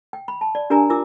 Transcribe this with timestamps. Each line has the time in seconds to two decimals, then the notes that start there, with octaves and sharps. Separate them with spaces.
0.13 G5
0.28 B5
0.41 A5
0.55 D5
0.70 D4 G4 A#4 D5 G#5 A#5
0.90 F4 A#4 D6 E6